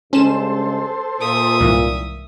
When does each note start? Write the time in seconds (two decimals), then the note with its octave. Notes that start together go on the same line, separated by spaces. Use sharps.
0.13 G2 C#3 G#3 C#4 A4 C5 E7
1.21 A#2 E5 D#6
1.60 C2 G#2 E3